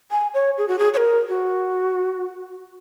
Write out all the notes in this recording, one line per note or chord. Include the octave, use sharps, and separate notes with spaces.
G#5
C#5
G#4
F#4
G#4
C#5
A#4
F#4